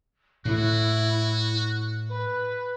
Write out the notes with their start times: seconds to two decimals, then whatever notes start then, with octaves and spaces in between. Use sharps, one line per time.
0.45 A2 E4 F#4
2.09 B4